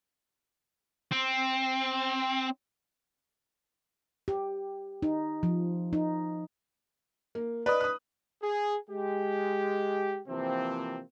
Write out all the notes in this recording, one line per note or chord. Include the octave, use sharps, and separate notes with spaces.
C4
G4
D#4
F3
D#4
A#3
B4 D5 D#5 D#6
D#6 F#6
G#4
G#3 G4
C3 E3 F3 A#3 C4